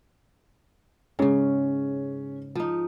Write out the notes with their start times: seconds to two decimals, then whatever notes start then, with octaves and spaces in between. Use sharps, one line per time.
1.19 G#2 C#3 C#4
2.55 F3 D#4